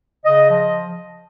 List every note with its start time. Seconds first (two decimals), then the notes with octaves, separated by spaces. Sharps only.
0.25 C#3 D#5
0.48 F3 D#5